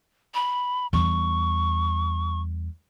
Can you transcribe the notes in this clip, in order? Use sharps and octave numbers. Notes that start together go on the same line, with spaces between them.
B5
E2 G3 C#6